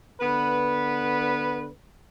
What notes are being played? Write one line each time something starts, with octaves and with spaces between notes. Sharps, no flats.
D3 B3 B4